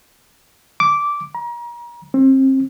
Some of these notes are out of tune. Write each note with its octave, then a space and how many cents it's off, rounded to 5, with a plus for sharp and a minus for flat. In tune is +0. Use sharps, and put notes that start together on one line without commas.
D6 -10
A#5 +35
C4 +30